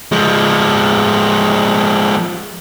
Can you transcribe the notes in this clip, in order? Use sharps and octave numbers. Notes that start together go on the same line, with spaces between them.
F3 G#3